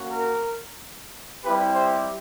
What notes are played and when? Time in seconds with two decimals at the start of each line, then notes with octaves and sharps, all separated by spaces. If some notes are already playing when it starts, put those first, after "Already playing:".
Already playing: A#3 C#4 F#4
0.10 A#4
1.44 G3 C4 E4 G4 B4
1.72 C5